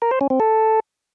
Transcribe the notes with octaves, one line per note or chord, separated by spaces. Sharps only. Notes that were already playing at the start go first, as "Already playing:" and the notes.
A#4
C5
C#4
C4
A4